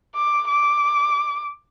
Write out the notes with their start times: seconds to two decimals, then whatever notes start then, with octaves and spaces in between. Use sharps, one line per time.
0.15 D6
0.49 D6